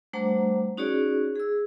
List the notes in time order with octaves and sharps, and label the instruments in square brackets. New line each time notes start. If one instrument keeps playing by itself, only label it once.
[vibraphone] G3 A3 D4 C5 F#5 A#5
C#4 D#4 F#4 G#4 C#5 D5
G#4 E6